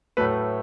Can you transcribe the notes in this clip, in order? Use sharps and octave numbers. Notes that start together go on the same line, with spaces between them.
A2 F#3 A3 B4